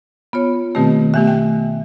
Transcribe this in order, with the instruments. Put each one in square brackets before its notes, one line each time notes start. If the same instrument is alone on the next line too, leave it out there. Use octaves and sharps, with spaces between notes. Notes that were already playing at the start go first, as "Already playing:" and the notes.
[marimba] B3 F4 C#5
[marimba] B2 D#3 A3 [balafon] C4 G4
[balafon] A3 B3 G4 [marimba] E5
[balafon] G5